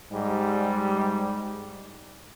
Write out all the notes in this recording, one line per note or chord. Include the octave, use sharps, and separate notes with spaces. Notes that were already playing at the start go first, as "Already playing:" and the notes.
G#2 G3